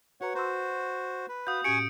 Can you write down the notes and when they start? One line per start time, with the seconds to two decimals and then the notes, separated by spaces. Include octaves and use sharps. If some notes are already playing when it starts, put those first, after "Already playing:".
0.21 F#4 B4 C#5 F#5 A#5
0.35 F#4 C5 A#5 C6 E6
1.29 B4
1.47 F#4 F5 F#5 D#6 G6
1.64 A2 C#4 G4 G#5 C#6 D#6 C#7 D7